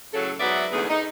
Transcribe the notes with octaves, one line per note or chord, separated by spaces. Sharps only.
A2 C#3 F#3 A4
G#2 F#3 B3 D5 E5
E2 G#2 D3 A3 B3 G#4
D#4